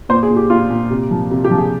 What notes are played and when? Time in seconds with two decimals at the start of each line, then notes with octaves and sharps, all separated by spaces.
0.09 A#2 C5
0.23 G#4
0.30 A#2
0.36 G4
0.50 A#2 F4
0.70 A#2
0.91 C3
1.11 F3
1.31 C3
1.44 G4
1.51 F3
1.58 G#4